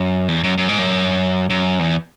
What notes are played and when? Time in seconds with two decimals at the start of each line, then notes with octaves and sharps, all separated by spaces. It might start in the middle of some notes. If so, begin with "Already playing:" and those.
Already playing: F#2
0.28 E2
0.44 F#2
0.58 F#2
0.69 G#2
0.79 F#2
1.50 F#2
1.79 E2